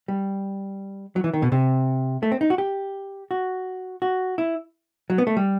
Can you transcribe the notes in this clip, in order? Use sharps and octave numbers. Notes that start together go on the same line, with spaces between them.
G3
F#3
E3
D#3
B2
C3
A3
C4
D#4
F#4
G4
F#4
F#4
E4
F#3
B3
A3
G3